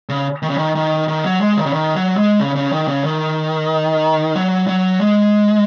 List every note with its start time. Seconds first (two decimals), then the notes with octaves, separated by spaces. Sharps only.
0.09 C#3
0.42 D#3
0.50 C#3
0.57 D#3
0.75 D#3
1.08 D#3
1.24 F#3
1.41 G#3
1.57 D#3
1.66 C#3
1.73 D#3
1.95 F#3
2.17 G#3
2.39 C#3
2.55 C#3
2.72 D#3
2.88 C#3
3.04 D#3
4.36 F#3
4.68 F#3
5.01 G#3